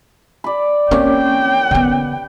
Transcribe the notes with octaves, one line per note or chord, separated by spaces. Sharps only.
D5 B5
A#3 C4 C#4 G4 C#5 G5
D3 B3